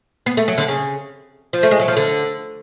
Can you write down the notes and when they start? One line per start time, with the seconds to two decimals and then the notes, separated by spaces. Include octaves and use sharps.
0.26 B3
0.37 A3
0.48 F#3
0.58 D3
0.68 C#3
1.53 F3
1.63 A3
1.71 G#3
1.80 F#3
1.88 F3
1.97 D3